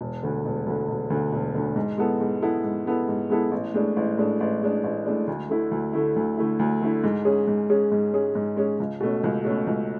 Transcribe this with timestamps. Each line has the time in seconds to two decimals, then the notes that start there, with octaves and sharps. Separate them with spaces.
0.01 E1
0.23 D2 D3
0.45 E1
0.66 D2 D3
0.88 E1
1.10 D2 D3
1.33 E1
1.55 D2 D3
1.76 G#2
1.98 G#3 B3 E4 A4
2.21 G#2
2.42 G#3 B3 E4 A4
2.64 G#2
2.85 G#3 B3 E4 A4
3.09 G#2
3.30 G#3 B3 E4 A4
3.51 A1
3.74 A2 G#3 D4
3.96 A1
4.18 A2 G#3 D4
4.40 A1
4.61 A2 G#3 D4
4.84 A1
5.06 A2 G#3 D4
5.27 D2
5.49 D3 A3 E4
5.71 D2
5.93 D3 A3 E4
6.16 D2
6.37 D3 A3 E4
6.59 D2
6.82 D3 A3 E4
7.03 G#2
7.25 G#3 C#4 G#4
7.47 G#2
7.70 G#3 C#4 G#4
7.91 G#2
8.13 G#3 C#4 G#4
8.35 G#2
8.57 G#3 C#4 G#4
8.80 C#2
9.00 B2 A3 C#4
9.24 C#2
9.45 B2 A3 C#4
9.67 C#2